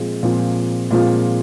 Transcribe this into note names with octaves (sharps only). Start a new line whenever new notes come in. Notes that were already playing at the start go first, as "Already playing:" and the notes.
Already playing: A#2 F3 G#3 C4 F4
A#2 F3 G#3 C4 F4
A#2 F3 G#3 C4 F4